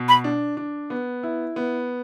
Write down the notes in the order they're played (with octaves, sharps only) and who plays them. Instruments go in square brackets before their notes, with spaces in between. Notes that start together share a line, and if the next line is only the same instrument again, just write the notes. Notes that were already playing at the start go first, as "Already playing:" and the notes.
Already playing: [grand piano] B2
[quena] B5
[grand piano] D4
D4
B3
E4
B3